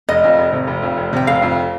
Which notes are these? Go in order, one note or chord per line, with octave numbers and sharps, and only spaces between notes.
F1 D#5
F2
F1
C3
F1
F2
F1
C3 G5
F1 F5
F2